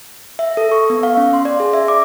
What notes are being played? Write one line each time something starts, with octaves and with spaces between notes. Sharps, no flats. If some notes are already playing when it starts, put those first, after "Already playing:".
E5
A4
C#6
B3
F5
C#4
C6
D5
G#4
E5
D6